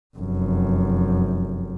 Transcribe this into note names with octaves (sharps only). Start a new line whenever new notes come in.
F1 F#2